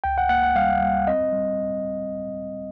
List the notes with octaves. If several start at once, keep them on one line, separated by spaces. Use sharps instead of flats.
C#2 G5
F#5
A#3 F#5
F#5
G3 F5
G3
C4 D#5
G3